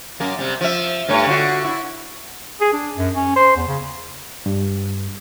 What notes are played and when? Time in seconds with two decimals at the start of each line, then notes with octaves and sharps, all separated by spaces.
0.20 F#2 A#3
0.38 C3 G3
0.61 F3 E5
1.09 G2 A3 C#5
1.27 D3 F4 F#4
1.64 E4
2.61 G#4
2.73 D4
2.96 F#2
3.16 C#4
3.36 C5
3.56 E2
3.67 C#3
4.46 G2